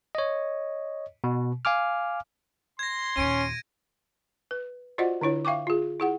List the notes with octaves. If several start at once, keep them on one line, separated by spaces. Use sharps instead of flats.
C#5 D#5
B2
F5 G#5 D6 F6
C6 G#6 A#6
D#2 A#2 C#4 D7 D#7
B4
F4 F#4 C5 D5 D#5 F#5
D3 D4 E4 C#5
E5 F5 G5 C#6 D6
F4 G#4
E4 G#4 F#5